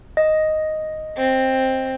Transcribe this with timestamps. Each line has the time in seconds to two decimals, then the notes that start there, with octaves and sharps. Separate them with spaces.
0.17 D#5
1.17 C4